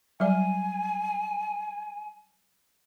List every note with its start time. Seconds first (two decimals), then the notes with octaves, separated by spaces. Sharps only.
0.20 F#3 G3 D5 G#5